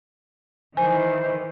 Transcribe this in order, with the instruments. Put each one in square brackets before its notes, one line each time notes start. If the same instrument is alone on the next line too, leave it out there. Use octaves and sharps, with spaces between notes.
[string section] D#3 E3 [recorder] C5 [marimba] G#5